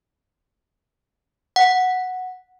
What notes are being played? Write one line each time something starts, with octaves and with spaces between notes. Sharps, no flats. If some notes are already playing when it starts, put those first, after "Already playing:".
F#5